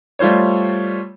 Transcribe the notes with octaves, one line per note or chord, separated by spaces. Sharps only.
G3 A3 F4 C5 C#5